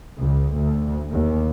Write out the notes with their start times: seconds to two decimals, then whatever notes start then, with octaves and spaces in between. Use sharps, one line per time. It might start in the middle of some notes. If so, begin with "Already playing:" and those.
0.22 C#2
0.56 D2
1.12 D#2